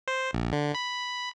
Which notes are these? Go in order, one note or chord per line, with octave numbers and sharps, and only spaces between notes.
C5
A#1
D3
B5